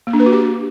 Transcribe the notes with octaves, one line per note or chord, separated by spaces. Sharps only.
A#3
D4
B4
F#4
G4